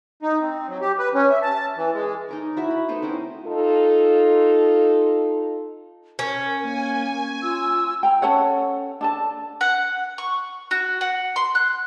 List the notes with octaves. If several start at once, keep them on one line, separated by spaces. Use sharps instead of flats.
D#4
C4
F#3
G4
B4
C#4
E5
A5
E3
G#3
D#4 A#4 C#5
E4 F#4 E5
B5
A3 B3 D#4 C5
C4 C#4 E4 A#4
D#4 F4 A4
C#4 A#4
A#3 G#5
F4 E6
G5 A#5
C#4 A4 C#5 F#5
D4 A4 A5
F#5
C#6
F#4
F#5
C6
F#6